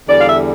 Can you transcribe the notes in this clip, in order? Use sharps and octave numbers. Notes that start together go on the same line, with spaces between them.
E2 D3 G3 D5
F5
E5